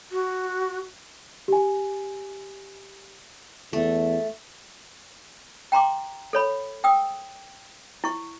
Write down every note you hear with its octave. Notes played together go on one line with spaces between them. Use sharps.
F#4
G4 G#5
E2 A3
G5 A#5 C6 D6
A4 C#5 B5
G5 D#6 E6
E4 C#6